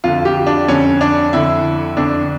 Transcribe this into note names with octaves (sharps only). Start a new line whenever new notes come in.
F2 D3 F4
G4
D4
F2 D3 C#4
D4
F2 D3 E4
F2 D3 D4